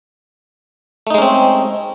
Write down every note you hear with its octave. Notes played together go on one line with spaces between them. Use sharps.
G#3 A3 C4 C#4 D#4